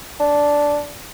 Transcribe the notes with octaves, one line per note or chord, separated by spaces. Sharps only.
D4